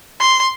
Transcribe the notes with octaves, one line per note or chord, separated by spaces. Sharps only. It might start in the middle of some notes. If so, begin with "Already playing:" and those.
C6